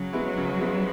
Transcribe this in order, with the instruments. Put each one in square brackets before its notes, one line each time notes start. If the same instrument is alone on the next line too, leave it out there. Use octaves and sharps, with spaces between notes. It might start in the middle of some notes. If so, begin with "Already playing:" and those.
Already playing: [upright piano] C#3 [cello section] F#3
[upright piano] G#3 B3 E4
C#3
G#3 B3 E4